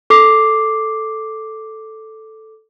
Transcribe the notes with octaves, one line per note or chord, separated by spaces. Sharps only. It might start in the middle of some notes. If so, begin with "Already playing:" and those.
A4 D6 C7